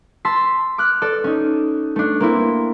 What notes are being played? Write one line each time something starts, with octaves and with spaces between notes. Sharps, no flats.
A5 C6 E6 B6
D6 F6 F#6
A4 D5
C#4 D#4
A3 D4
A#3 C4 E4